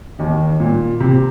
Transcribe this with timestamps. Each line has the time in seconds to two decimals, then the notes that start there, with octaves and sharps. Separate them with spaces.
0.19 D#2 D#3
0.60 A#2
1.00 C3